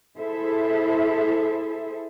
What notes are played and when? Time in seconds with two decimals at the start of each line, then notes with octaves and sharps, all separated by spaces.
0.19 E4 G#4 A4 C5 E5